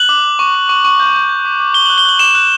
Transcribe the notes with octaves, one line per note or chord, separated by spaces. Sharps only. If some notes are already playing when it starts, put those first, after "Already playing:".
Already playing: F#6 F#7
D6
D6
C#6
C#6
C#6
C#6
G6
G6
G6
D6
D6
D6 G7
F#7
F#6
G7
F#6 F#7
D6 E7
F#6